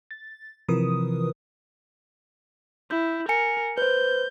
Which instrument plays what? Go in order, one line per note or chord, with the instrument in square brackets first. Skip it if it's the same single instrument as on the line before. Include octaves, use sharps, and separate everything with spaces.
[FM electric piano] A6
C3 E3 F3 A#4 B4 D#6
[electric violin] E4 [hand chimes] G6
[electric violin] A#4 [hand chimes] G#5 C#7
[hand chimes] B4 C5 [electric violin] G6